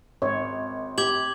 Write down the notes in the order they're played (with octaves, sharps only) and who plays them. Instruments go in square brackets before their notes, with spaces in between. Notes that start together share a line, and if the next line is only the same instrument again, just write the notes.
[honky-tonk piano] G#1 [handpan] C#5
[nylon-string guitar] G4 [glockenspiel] D6 G#6 F#7